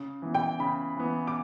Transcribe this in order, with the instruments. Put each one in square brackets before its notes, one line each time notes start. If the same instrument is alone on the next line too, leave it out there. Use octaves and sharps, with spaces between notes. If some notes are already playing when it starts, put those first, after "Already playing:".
Already playing: [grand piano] C#3
E3 B3
[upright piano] G5
[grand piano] C#3 [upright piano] B5
[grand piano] E3 B3
[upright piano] D6